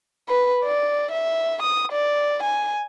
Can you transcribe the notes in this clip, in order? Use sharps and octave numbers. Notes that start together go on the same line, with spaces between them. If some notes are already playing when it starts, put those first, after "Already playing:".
B4
D5
E5
D#6
D5
G#5